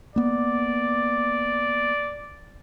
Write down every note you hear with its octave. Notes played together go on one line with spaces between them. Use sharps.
A#3 B3 D5